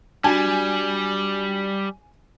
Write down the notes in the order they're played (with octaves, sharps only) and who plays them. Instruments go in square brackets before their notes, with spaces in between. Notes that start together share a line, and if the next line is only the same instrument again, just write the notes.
[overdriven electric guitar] G3 [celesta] D4 F#4 [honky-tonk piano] G#5